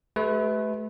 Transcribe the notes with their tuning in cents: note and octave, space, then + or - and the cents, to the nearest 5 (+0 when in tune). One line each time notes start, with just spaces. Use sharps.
A3 -30 G4 -10 B4 +15